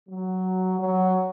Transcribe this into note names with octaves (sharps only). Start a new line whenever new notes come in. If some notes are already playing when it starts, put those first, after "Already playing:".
F#3
F#3